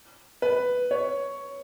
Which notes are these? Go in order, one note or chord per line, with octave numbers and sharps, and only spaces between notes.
B4
C#5